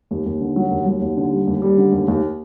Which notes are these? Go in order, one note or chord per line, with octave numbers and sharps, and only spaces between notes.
D#2
D#2
D3
F#3
D#2
F#3
D#2
D3
G3
D#2
G3
D3
D#2
D#2